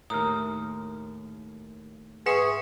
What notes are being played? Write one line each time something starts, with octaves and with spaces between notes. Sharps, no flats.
D#2 A2 A#4 A#5 D#6 F6
G#2 G#4 B4 E5 F#5 C#6 C#7